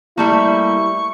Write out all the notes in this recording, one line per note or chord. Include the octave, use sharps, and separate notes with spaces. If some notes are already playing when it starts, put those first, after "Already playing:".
G3 A3 A#3 E4 C#6